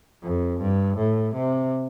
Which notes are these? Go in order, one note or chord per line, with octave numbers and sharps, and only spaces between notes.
F2
G2
A2
C3